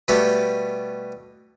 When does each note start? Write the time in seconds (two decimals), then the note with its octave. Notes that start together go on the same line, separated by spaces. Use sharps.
0.08 B2 G3 A3 B3 G4